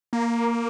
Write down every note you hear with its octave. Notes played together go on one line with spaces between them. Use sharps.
A#3